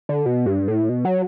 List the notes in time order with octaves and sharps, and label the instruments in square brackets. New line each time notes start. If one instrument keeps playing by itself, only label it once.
[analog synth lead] D3
B2
G2
A2
B2
F#3